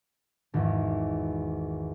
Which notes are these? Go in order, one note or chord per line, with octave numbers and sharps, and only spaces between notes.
G#1 E2